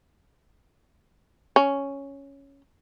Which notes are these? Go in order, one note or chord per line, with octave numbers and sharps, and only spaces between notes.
C#4